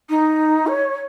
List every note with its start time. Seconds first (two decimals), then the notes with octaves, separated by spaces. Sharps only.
0.09 D#4
0.67 C#5